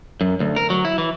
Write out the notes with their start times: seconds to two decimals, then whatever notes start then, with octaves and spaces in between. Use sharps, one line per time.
0.21 F#2
0.40 D2
0.56 A#4
0.70 F#3
0.85 E4
0.98 E3